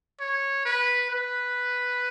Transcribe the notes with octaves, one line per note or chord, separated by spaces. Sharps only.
C#5
B4
B4